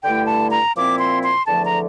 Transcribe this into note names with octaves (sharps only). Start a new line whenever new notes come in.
G2 D3 A3 E4 G5
A5
A#5
A#2 F3 C4 E4 D6
C6
C6
E2 D3 F3 A3 A5
A#5